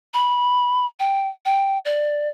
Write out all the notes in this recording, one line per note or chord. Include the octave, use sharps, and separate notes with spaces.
B5
G5
G5
D5